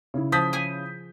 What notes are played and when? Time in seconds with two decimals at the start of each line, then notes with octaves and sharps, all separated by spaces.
0.14 C#3 E4
0.32 F3 D#6 G6 B6
0.53 G#4 G#5